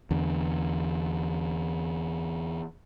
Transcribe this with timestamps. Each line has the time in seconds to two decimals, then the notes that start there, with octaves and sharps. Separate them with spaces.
0.11 E2 D3